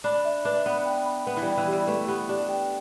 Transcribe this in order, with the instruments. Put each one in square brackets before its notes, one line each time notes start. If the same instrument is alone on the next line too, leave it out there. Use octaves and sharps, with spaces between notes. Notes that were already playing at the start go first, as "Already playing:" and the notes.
[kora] D4 [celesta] B5
[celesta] E5
[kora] D4 [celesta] B4
[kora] B3 [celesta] B5
[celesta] G5
B5
[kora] B3 [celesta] B4
[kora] E3
G3
[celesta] G5
[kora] E3
[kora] G3 [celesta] G4
[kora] A3 [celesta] B4
[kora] B3 [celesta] G4
[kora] D4 [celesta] G4
[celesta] G5